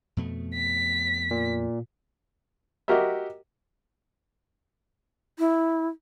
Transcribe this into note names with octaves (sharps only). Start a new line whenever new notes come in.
F2 B2 A3
B6
A#2
F#4 G4 A#4 D#5 E5
E4